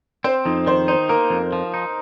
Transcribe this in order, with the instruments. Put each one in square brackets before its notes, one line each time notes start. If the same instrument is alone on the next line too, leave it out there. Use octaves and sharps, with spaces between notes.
[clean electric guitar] C4 [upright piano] C5
[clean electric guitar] F2 [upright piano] D#4
[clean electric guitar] D#3 [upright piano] C5
[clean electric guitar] D#4 [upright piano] C5
[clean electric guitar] A#3 [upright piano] A#4
[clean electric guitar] F2
F3
D#4